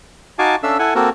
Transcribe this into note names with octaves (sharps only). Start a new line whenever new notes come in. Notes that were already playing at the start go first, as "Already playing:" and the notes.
D#4 F#4 F5 G#5 A5 D6
C#4 D4 A4 E5 F5 E6
E4 A4 F#5 G#5
A#3 C4 F#4 A4 A#4